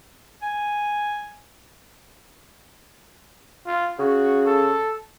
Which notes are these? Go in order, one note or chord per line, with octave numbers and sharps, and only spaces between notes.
G#5
F4
C#3 F#4
A4